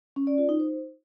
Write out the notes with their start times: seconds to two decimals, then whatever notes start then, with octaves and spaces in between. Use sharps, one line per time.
0.16 C#4
0.27 D5
0.38 F4
0.49 D#4
0.60 C5